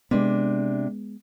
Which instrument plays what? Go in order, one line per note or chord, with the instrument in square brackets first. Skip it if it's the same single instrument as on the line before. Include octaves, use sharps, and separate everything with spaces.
[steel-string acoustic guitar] C3 D4 [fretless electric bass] G#3 B3